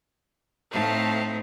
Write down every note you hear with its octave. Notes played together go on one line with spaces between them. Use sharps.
A2 A3 C4 D#4 F5 A5